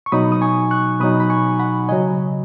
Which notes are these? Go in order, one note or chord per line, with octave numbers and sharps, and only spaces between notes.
C#6
B2 F#3 D#4 B5 D#6
D#6
G#5 C#6
C#6 F#6
B2 F#3 D#4 B5 D#6
B5
G#5 C#6
F#5 B5
C#3 F#3 D#5 G#5